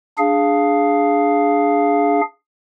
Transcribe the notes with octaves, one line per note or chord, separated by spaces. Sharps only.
D4 G#4 F5